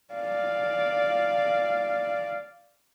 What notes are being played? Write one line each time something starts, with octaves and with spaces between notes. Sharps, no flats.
D5 F5